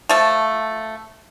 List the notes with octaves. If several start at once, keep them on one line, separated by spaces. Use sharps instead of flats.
F3 A3